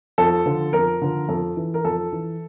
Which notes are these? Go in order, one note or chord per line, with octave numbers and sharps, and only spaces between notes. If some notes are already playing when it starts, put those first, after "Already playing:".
F2 A4
D3 F3
F2 A#4
D3 F3
F2 A4
E3
A#4
F2 A4
E3